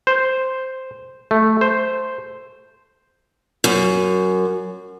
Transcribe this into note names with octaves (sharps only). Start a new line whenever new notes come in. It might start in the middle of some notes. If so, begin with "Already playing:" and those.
C5
A3
C5
F#2